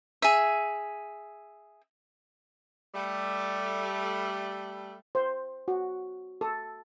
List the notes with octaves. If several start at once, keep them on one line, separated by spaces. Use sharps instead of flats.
G#4 E5
G3 A3
C5
F#4
A4